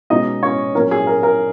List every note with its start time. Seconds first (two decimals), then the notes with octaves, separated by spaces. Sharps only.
0.10 B2 G#3 C#4 D#4 D#5
0.43 C#4 C#5
0.75 A#2 F#3 C#4 A#4
0.91 G#4
1.07 A#4
1.23 A#4